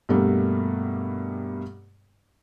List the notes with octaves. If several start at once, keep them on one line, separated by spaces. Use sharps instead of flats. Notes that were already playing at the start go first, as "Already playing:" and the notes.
G2 B2 G3 A3 A#3